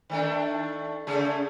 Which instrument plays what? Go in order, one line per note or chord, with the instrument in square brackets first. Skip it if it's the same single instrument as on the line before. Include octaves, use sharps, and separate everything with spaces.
[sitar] D#3 A3 D4
C#3 A3 G#4